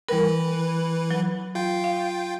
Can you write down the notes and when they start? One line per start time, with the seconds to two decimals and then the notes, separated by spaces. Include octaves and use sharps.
0.08 E3 G3 A#4 B4
1.11 F#3
1.55 F4 G5
1.84 F5